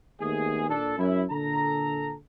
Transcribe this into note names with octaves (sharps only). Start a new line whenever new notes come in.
D#2 A3 B3 G#4
A#2 D4 A4
F#2 F#3 E4
A#2 D3 A4 A#5